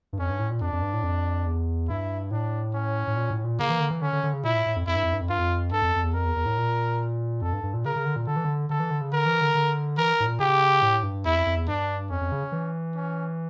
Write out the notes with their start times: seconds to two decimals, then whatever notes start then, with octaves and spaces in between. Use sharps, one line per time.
0.13 G2
0.19 F2 C#4
0.30 G2
0.39 A2
0.50 A#2
0.61 F2 D4
0.73 F2
0.82 G2
0.94 A2
1.03 F2
1.46 E2
1.88 G2 E4
2.31 A2 D4
2.74 C#4
3.07 A2
3.16 A#2
3.30 A2
3.44 A#2
3.59 C#3 A#3
3.70 E3
3.80 D3
3.91 E3
4.02 D3 C#4
4.13 D3
4.23 D3
4.33 C#3
4.44 A#2 E4
4.55 A2
4.66 A2
4.76 F2
4.87 F2 E4
4.96 G2
5.03 F2
5.13 G2
5.21 F2
5.29 G2 F4
5.38 F2
5.72 G2 A4
5.82 F2
5.96 F2
6.03 E2
6.14 F2 A#4
6.25 E2
6.36 E2
6.46 A2
6.58 A#2
7.42 F2 A4
7.53 G2
7.63 G2
7.74 A#2
7.85 C#3 A#4
7.96 C#3
8.06 D3
8.16 A#2
8.27 D3 A4
8.36 E3
8.45 D3
8.70 D3 A4
8.80 E3
8.91 D3
9.01 C#3
9.12 D3 A#4
9.26 E3
9.41 D3
9.55 D3
9.98 E3 A#4
10.20 A2
10.26 A#2
10.39 C#3 G4
10.82 A2
11.03 G2
11.25 E2 E4
11.35 F2
11.46 F2
11.56 E2
11.68 G2 D4
12.10 F2 C#4
12.21 F2
12.32 C#3
12.52 E3
12.95 C#4